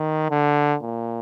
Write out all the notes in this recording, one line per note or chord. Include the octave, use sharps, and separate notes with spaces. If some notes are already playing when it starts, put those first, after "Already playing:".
Already playing: D#3
D3
A#2